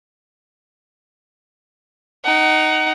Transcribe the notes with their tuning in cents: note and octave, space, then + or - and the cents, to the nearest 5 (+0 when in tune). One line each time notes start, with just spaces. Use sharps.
D#4 +0 F#5 +30